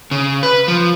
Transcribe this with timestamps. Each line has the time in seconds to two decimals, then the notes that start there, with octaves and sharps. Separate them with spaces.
0.11 C#3
0.43 B4
0.68 F3